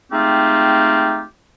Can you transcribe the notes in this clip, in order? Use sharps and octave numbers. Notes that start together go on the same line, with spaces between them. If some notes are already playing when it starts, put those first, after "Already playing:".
G#3 A3 C4 D#4 F4 G4